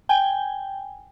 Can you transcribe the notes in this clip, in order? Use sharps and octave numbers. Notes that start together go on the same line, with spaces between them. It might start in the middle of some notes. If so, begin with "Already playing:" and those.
G5 G#5